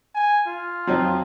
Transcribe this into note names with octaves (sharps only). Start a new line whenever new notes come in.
G#5
F4
F2 F3 F#3